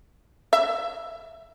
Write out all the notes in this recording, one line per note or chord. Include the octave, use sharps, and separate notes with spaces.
E5